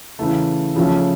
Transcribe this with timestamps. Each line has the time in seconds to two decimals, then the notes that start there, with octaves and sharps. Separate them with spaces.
0.19 C#3 E3 A3
0.76 C#3 F3 A3 C#4